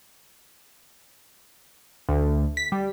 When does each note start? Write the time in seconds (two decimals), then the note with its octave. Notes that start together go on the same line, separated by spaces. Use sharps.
2.09 D2
2.57 B6
2.72 G3